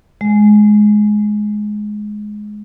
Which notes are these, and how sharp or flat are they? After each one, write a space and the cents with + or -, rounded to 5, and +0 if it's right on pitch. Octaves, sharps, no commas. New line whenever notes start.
G#3 +10